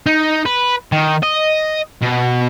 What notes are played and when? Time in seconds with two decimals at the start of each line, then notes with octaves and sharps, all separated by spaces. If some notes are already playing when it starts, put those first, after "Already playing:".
0.06 D#4
0.46 B4
0.92 D#3
1.23 D#5
2.02 B2